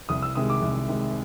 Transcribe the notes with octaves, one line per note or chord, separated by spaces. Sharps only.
C2 D#6
E6
C3 D#3 G#3 D#6
D6
C2
C3 D#3 G#3